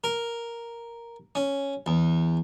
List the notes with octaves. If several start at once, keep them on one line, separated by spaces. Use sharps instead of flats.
A#4
C#4
E2